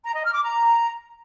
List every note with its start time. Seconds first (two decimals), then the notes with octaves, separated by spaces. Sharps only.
0.05 A#5
0.14 D#5
0.24 F6
0.34 D6
0.43 A#5